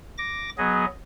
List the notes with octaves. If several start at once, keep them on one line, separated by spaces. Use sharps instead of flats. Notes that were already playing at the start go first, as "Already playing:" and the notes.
D6 A#6
F#3 B3 G#4 D#5